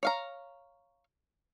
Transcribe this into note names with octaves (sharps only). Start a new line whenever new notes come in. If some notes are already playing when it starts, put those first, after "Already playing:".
C#5 F5 A#5